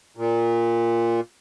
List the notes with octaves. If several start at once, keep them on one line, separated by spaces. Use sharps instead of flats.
A#2